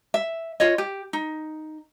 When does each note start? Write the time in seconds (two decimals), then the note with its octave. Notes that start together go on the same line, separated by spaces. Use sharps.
0.14 E5
0.60 F4 C#5 D#5
0.78 G4
1.13 D#4